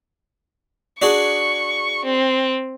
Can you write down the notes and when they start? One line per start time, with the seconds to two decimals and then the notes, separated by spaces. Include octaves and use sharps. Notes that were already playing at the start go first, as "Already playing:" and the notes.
1.02 D4 F#4 G#4 C#6
2.05 C4